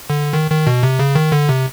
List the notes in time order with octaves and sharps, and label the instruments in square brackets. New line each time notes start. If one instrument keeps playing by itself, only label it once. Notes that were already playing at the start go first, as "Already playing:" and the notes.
[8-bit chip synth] D3
D#3
D#3
B2
C3
C#3
D#3
D3
C3